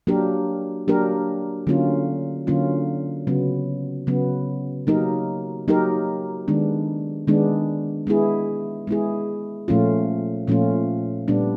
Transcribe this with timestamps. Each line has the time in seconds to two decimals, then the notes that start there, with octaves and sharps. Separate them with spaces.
0.07 F#3 A#3 D4 G4 A#4
0.88 F#3 A#3 D4 G4 A#4
1.67 D3 F#3 A#3 C#4 F4
2.47 D3 F#3 A#3 C#4 F4
3.27 C#3 F#3 B3
4.07 C#3 F#3 B3
4.87 F#3 A#3 D#4 G4 A#4
5.68 F#3 A#3 D#4 G4 A#4
6.48 D#3 G#3 B3 D4
7.27 D#3 G#3 B3 D4
8.07 G#3 B3 E4 G#4
8.87 G#3 B3 E4 G#4
9.68 A#2 F3 A3 C#4 F4
10.47 A#2 F3 A3 C#4 F4
11.28 A#2 G3 B3 D4